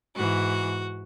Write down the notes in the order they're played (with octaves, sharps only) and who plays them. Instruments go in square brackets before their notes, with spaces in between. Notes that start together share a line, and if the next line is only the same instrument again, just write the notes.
[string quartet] G#2 E3 F#4